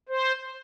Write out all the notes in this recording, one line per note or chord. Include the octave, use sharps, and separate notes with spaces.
C5